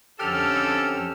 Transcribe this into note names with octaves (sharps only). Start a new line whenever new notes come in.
F2 D3 C#4 G4 A4 E6 F6